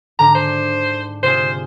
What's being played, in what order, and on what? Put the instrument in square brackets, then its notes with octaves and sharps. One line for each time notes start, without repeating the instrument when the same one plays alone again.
[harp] G#2 D3 [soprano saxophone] A#5
[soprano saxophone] C5
[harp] C3 F4 G#4 [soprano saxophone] C5